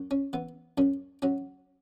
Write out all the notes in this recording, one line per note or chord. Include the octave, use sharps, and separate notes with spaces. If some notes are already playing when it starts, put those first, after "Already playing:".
Already playing: F#2
C#4
E3 B3
F#2 C#4
F#3 C#4